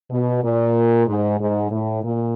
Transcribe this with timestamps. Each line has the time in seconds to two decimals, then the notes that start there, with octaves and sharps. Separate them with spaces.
0.11 B2
0.44 A#2
1.08 G#2
1.40 G#2
1.71 A2
2.04 A#2